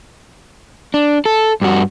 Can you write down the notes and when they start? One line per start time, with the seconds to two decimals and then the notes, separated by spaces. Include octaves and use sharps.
0.94 D4
1.26 A4
1.62 G2 F#4